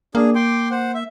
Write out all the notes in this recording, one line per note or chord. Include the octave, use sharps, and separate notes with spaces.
A#3 D4 G#4
G5 C6 D6
C5 F#5
E5